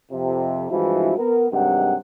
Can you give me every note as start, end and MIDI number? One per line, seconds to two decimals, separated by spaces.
0.11 0.68 41
0.11 0.68 48
0.70 1.13 43
0.70 1.13 52
0.70 1.13 53
0.70 1.13 56
0.70 1.13 64
0.70 1.13 66
1.18 1.47 59
1.18 1.47 70
1.52 1.95 43
1.52 1.95 48
1.52 1.95 51
1.52 1.95 54
1.52 1.95 56
1.52 1.95 78